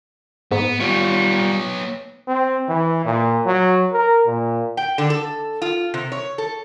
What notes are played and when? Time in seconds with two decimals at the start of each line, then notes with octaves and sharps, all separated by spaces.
0.52 G#2 B3
0.80 G3 B3 F4 C#5
2.28 C4
2.68 E3
3.05 A#2
3.46 F#3
3.93 A#4
4.26 A#2
4.77 G5
4.98 D3
5.10 A4
5.62 F4
5.94 C3
6.12 C#5
6.38 A4